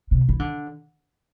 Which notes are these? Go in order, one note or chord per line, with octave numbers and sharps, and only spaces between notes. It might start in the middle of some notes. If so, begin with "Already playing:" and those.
C3
E3
D3